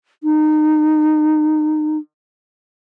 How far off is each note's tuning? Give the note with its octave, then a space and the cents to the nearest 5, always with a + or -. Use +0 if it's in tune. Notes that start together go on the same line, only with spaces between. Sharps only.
D#4 -25